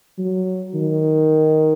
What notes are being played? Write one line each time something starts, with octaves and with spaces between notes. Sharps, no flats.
F#3
D#3